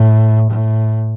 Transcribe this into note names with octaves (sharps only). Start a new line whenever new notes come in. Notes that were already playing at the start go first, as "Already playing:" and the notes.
Already playing: A2
A2